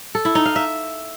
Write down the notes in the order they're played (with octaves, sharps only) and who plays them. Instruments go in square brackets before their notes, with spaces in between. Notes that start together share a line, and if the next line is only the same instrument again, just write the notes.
[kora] A4
E4
D#4
F5
E5